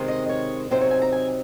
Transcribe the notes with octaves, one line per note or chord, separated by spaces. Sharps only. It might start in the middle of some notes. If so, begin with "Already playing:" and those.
Already playing: C3 D#3 G#3 C4
D#5
C#5
C3 F#3 C4 D#4 C5
C#5
G#5
A#5
G#5